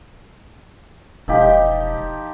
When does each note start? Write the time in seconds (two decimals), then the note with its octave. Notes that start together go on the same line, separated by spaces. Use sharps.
1.28 E1 F3 D#4 G4